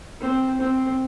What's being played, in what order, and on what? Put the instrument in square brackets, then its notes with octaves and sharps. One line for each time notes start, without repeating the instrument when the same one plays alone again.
[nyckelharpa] C4
C4